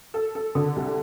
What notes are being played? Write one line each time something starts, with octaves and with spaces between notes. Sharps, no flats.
A4
A4
D3
C2